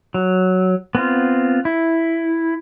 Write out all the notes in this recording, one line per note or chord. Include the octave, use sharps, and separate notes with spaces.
F#3
B3 C4 F4
E4